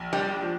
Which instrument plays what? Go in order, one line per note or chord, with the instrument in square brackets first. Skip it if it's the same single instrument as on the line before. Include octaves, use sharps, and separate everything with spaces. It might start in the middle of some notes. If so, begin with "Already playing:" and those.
Already playing: [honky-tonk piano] A#1
[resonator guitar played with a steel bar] G3 [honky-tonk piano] D4
[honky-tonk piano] F3